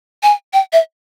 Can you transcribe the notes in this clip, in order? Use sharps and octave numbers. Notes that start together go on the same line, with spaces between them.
G#5
G5
E5